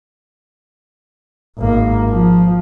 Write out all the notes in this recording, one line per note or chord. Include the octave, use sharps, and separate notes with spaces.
G#1 A#3
F3